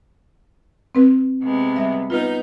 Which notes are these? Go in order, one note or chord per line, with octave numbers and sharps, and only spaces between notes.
C4 B4
C3 G#3 B3
G3 E5
B3 D#4 F4 B4 F6 G6